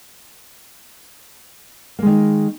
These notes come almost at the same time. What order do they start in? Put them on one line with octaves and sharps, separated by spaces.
A#3 G#3 D#3